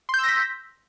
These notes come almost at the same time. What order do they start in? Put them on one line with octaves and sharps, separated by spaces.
C6 G6 E6 A#6 B6